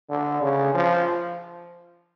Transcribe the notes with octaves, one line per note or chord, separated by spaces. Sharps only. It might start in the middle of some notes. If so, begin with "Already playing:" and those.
D3
C#3
F3